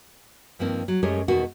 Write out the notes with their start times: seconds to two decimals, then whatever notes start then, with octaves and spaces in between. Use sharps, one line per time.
0.59 G2 D#3 F3 A#3 C4
0.88 F#3
1.03 F#2 G#3 A3 G4 A#4 C#5
1.28 E2 B2 D#3 F#4